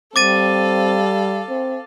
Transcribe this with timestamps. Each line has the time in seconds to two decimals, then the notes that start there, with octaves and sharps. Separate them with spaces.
0.16 G3 C4 A4 F5 D6 A6 D#7
1.49 C4